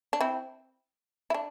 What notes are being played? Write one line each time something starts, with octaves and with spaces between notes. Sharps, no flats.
D4
C4 E4
E4
D4